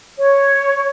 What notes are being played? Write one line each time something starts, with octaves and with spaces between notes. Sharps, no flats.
C#5